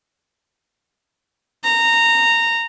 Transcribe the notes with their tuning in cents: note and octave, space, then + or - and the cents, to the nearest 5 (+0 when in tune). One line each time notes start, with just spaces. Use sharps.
A#5 -15